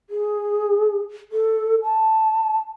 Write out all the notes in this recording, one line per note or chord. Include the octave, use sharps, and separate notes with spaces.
G#4
A4
A5